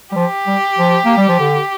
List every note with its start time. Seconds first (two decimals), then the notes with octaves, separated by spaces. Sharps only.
0.12 G3
0.16 F3 G4
0.47 G3
0.78 F3
1.05 A#3
1.17 G3
1.29 F3
1.40 D3